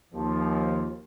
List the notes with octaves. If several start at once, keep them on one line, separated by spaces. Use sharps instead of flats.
D#2 F3